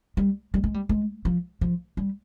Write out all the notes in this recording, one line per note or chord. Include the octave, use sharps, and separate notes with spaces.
G3
G3
G#3
G3
G#3
F3
F3
G3